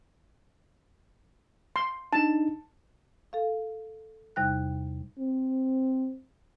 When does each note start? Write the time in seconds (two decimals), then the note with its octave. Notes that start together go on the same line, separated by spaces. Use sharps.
1.76 C6
2.13 D4 D#4 A5
3.33 A4 F5
4.36 E2 C3 G3 D#4 G5 F#6
5.19 C4